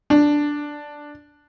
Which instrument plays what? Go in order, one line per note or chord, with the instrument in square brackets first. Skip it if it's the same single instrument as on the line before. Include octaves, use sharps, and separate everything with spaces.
[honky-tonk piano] D4